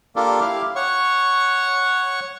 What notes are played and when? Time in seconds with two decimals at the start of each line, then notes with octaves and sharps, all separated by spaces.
0.16 A#3 D4 F4 G4 A4 A#4
0.40 E4 G4 F5
0.76 C#5 F#5 C#6